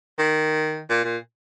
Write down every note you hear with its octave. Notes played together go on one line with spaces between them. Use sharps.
D#3
A#2
A#2